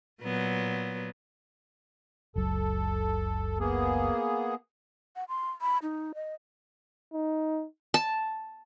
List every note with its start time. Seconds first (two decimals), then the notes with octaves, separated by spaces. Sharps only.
0.22 A#2 F#3 B3
2.36 F#1 C#2 F#3 A4
3.60 A#3 B3 G#4
5.16 F#5
5.29 C6
5.61 B5
5.83 D#4
6.15 D#5
7.13 D#4
7.94 A5